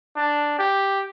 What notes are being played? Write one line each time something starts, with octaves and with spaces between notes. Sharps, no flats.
D4
G4